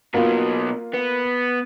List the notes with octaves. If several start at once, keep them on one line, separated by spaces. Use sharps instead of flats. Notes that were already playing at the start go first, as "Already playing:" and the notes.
B2 F#3 A#3 F4
B3